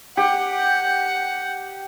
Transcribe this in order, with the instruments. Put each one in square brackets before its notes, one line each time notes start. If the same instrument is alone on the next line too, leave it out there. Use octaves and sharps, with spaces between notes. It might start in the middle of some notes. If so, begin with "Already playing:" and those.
[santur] G4 [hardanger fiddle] F#5